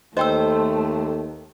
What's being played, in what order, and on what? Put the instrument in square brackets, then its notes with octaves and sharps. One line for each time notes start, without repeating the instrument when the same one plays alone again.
[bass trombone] D#2 [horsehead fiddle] A3 [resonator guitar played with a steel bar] C5 [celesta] D#5 G5 E6